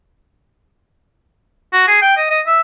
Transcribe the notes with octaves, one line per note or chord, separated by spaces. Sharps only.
F#4
G#4
G5
D#5
D#5
E5